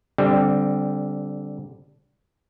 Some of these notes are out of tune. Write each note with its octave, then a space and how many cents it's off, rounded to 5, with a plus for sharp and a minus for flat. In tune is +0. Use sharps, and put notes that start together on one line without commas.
D3 -15 G3 +0 C4 +0